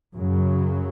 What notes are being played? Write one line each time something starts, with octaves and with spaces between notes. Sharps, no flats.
F#2 C#3 F#3